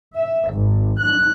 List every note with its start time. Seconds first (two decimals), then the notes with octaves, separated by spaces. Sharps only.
0.15 E5
0.49 G#1
1.00 F#6